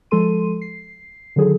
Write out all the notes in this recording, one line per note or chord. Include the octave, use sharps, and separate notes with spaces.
F3 G#3 A4 C6 D#7
C7
D3 D#3 F#3 G#4 A4